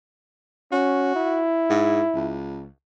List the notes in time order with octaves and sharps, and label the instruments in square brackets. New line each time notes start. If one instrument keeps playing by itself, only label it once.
[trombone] C#4 [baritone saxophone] F#4
[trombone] E4
[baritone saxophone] G#2
C#2